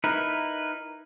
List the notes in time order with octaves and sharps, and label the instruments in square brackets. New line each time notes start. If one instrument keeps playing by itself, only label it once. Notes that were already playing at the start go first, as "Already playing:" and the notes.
[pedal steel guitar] D#4 E4 A#4 B4